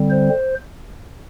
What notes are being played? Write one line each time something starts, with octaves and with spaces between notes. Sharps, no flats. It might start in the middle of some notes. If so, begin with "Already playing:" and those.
Already playing: D3 G3 C4
C5